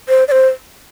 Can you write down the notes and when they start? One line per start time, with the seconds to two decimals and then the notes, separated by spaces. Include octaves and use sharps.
0.09 C5
0.28 D5
0.32 C5